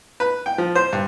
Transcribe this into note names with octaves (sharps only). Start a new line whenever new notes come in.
B4
G5
F3
C5
G2